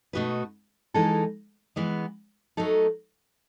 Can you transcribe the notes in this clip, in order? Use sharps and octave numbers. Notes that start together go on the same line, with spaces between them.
B2 A3 D#4 F#4 B4
E3 G#3 D#4 A4
E3 G#3 B3
F#3 A3 D#4 A4